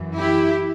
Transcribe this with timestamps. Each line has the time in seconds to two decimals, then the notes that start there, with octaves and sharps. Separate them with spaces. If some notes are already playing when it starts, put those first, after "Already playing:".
Already playing: F#2 E3
0.18 E4 G4